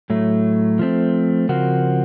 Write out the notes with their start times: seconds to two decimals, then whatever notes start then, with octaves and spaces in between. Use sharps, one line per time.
0.10 A2 F#3 A3
0.79 F3 A3 C4
1.49 C#3 F3 C4 F#4 A#4